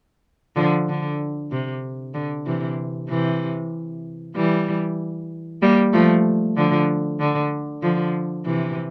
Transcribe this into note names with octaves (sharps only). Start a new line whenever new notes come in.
D3 F3
D3
C3
D3
C3 E3
C3 E3
E3 G3
G3 A#3
F3 A3
D3 F3
D3
D3 F3
C3 E3